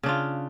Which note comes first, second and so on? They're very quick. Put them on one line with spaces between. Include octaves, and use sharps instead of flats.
C#3 D4 F4